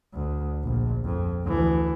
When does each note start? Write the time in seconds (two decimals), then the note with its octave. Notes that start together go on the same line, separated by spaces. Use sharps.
0.14 D2
0.64 A#1
1.05 F2
1.45 D2 E3